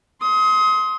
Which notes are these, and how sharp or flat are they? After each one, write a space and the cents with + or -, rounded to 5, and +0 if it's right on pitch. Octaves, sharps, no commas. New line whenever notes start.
C6 +5 D#6 +30